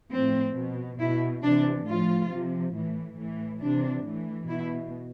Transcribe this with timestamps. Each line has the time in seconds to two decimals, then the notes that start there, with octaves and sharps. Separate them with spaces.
0.12 A2 F3 C4
0.56 B2
0.99 B2 E4
1.42 C3 E3 D4
1.86 A2 F3 F4
2.31 C3 F3
2.73 A2 E3
3.17 A2 E3
3.61 C3 E3 D4
4.04 A2 E3
4.48 B2 E4